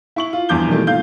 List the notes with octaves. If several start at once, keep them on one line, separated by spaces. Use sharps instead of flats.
E4 C#6 F#7
F4
E2 G2 F3 D6 G6 G7
B2 D#3 E3 G3 A3 A#3
B1 G#2 F4 F5 G6 G7